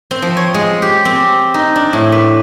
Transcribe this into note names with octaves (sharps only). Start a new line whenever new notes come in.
C4
F3
C#5
G#3
G4
C4
D#4
D4
A2
B4